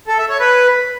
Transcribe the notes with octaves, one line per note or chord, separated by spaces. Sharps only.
A4
E5
C#5
B4